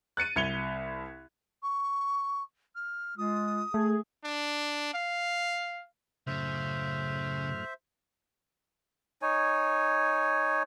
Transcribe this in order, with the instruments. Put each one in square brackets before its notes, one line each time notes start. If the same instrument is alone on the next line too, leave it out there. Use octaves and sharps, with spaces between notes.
[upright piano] F#6 A6 C#7 D#7
C2 G#6 C#7 F7 G7
[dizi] C#6
F6
[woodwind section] G#3 F4 [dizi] D#6
[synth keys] A3 [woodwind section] G#4
[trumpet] D4
F5
[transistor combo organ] F#2 A2 F6 [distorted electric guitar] C#3 [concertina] C5 E5
[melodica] D#4 C#5 G#5